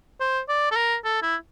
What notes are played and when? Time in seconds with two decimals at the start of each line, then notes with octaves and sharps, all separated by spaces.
0.20 C5
0.49 D5
0.71 A4
0.76 A#4
1.04 A4
1.23 E4